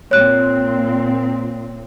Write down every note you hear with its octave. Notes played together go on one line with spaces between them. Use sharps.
A#2 C4 C#5 F#6